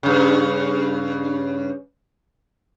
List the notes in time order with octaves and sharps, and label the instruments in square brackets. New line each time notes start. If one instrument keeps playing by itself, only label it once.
[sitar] G2 C#3